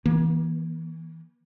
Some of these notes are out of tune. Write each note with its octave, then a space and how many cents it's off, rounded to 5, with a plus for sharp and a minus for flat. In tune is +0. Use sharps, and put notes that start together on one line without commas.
E3 -20 A#3 +35